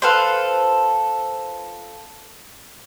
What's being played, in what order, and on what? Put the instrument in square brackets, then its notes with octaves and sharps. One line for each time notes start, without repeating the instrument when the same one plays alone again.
[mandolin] F4 A4 B4 C5